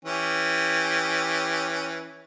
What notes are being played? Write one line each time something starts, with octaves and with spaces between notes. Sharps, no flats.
E3 C#4 G4